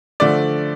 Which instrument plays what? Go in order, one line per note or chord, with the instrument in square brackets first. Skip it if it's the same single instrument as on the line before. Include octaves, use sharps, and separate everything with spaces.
[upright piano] D3 F3 A3 D5